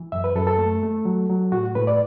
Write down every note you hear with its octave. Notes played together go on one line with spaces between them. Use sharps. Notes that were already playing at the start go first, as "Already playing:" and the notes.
Already playing: E3
F#2 E5
B4
F#2 A4
A4
A3
A3
F#3
F#3
A2 F#4
A2 B4
D5